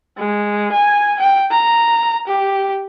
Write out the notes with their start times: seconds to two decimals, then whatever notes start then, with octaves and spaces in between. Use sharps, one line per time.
0.17 G#3
0.72 G#5
1.20 G5
1.51 A#5
2.27 G4